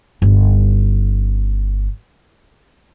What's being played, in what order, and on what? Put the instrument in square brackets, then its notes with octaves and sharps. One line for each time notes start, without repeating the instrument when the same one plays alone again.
[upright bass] G1 C#4